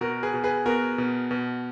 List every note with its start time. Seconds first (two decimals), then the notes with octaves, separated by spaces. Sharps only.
0.01 B2 F#4 A#4
0.23 G#4 B4
0.34 B2
0.44 G#4 B4
0.66 B3 F#4 A#4
0.98 B2
1.31 B2